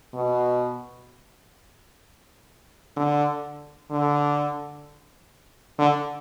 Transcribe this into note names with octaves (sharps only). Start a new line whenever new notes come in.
B2
D3
D3
D3